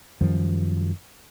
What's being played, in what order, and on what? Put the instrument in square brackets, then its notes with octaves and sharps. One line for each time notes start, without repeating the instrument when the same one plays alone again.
[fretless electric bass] F#2 D#3 F3 G3